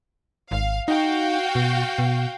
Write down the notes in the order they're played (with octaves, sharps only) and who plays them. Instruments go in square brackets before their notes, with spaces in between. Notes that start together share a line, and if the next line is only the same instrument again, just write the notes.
[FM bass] G#1 [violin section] F5
[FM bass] D#4 [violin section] F#4 F5 G5
[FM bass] B2
B2